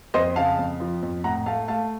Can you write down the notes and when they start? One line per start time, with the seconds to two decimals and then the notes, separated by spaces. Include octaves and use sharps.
0.14 F2 C5 D#5
0.36 C#3 F5 A5
0.58 F2
0.80 F3
1.02 F2
1.24 A2 F#5 A#5
1.46 A3 F5 A5
1.68 A3 F5 A5